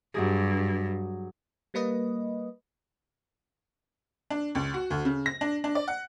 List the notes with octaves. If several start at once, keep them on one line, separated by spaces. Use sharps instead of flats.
G2 F#3 G4 G#4
G3 A#3 B4 D#5
D4
C#2
F#4
D2
C#3
A#6
D4
D4
D5
F#5